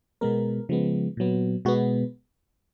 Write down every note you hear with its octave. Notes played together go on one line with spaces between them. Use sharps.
B2 G#3 B3 A#4
C#3 F3 G#3 B3
A#2 F#3 B3
B2 G#3 B3 F#4